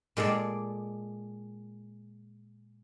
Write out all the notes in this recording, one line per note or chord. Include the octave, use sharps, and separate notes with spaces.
A#2 G#3 A4 D5